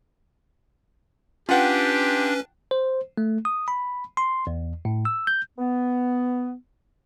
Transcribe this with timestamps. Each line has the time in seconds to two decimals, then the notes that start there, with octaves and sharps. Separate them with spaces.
1.49 C#4 D4 F4 G4 B4 F#5 G5
2.71 C5
3.18 A3
3.45 D#6
3.68 B5
4.17 C6
4.47 E2
4.85 A2
5.05 E6
5.27 G6
5.58 B3